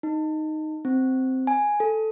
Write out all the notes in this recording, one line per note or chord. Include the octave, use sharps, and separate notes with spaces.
D#4
C4
G#5
A4